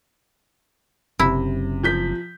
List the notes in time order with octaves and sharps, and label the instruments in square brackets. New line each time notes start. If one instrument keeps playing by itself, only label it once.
[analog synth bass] F#1 [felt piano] C3 [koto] E4
[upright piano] F3 G6 B6